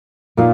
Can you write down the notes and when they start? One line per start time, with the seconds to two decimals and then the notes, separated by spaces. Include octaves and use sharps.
0.37 A#2 D#4 F4